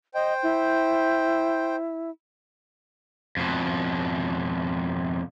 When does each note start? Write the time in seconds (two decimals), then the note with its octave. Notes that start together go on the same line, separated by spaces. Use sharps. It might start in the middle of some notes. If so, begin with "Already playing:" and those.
0.14 C5 D#5 G5
0.43 E4
3.37 F2 B2